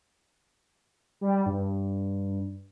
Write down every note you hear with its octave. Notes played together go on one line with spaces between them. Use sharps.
G3
G2